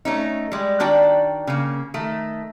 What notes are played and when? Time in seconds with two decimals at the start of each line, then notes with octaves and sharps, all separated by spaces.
0.05 A3 C#4 D#4
0.52 G3 G#3
0.80 D#3 D4 F#4 D5 G5
1.47 C#3 A#3
1.94 D#3 A3